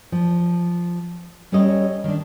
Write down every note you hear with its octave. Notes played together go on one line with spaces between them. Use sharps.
F3
G3 C#4 A4 C#5 D#5
D#3 D4